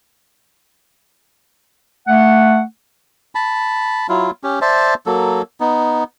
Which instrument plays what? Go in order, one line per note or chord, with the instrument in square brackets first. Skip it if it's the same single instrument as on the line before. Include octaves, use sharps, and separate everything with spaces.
[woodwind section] A3 F#5
[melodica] A5 B5
F#3 E4 F4
C#4 G4
C5 D5 E5 A5
F#3 A#3 A4
B3 D#4